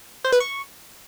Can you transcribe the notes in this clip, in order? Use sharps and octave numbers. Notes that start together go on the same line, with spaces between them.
C5
B4
C#6